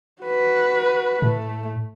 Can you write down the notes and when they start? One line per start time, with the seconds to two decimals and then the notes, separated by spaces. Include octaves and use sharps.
0.22 F#4 B4
1.22 A2 A3